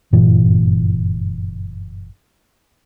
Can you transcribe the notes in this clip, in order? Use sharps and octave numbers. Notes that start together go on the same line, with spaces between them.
F#1 G2 A#2 E3